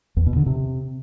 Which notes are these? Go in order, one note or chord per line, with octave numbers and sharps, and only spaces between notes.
E2
B2
D3
C3